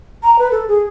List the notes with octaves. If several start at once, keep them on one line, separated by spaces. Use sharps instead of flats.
A#5
B4
A4
G#4